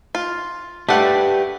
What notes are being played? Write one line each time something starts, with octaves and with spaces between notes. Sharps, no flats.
F4
A3 G4 B4 D5 F#5